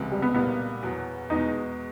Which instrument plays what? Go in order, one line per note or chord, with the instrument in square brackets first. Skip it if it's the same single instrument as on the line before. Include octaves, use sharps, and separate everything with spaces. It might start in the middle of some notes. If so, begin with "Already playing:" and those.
Already playing: [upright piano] C#2 C3 F3 G#3
[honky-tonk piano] G3
B3
[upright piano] B1 A#2 G3 A#3 [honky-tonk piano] B3
[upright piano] E2 B2 F#3
[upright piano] E2 B2 G#3 [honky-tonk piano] D#4